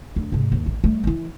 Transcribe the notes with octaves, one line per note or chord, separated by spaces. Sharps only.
D2
G#2 C3
D#2
A1
G3 A3
E3 E4